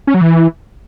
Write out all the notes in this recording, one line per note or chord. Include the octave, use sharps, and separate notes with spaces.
C#4
F#3
E3